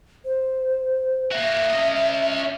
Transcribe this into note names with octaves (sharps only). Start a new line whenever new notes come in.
C5
A#3 F#4 E5
C#4 D#5